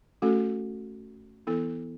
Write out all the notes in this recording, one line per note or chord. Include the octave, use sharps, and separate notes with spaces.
A3 C#4 F#4 A4
E3 B3 E4 A4